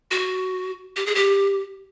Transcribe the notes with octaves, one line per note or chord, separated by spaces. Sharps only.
F#4
G4
G#4
G4